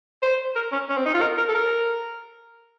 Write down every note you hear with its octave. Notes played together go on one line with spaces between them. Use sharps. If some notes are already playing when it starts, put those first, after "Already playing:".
C5
A#4
C#4
C#4
C4
D#4
F4
A#4
A#4
A4
A#4